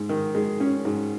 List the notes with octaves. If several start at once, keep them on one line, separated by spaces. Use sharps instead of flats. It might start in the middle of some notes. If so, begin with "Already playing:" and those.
Already playing: G#2
D#3
G#3
C#4
G#2